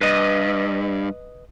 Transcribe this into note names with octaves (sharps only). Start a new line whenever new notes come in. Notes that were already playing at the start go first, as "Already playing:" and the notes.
G2 B4 D#5